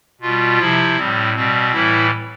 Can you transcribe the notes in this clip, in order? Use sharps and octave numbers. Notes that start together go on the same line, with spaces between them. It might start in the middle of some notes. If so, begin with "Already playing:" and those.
B2 G3 F4
C3 F3 E4
A2 G3 C4
B2 G3 C4
A2 E3 G3 E4